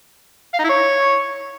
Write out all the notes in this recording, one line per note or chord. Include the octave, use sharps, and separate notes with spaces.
F5
D#4
E4
C#5